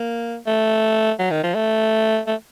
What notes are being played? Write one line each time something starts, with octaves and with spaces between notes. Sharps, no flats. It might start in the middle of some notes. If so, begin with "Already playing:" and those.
Already playing: A#3
A3
F#3
D#3
F3
A3
A3